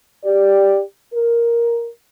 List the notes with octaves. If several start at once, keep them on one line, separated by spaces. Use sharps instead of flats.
G4 D5
A#4